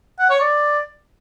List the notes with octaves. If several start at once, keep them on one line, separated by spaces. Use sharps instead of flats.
F#5
C#5
D5